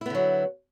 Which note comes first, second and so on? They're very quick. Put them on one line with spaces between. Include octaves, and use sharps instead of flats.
E4 B3 D3 F#3